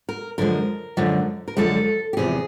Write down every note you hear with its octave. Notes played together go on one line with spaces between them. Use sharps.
A#4
F#2 D3 F3 G#3 A#4
F#2 D3 F3 G#3
A#4
F#2 D3 F3 G#3 A4
G4
E2 C3 F3 G#4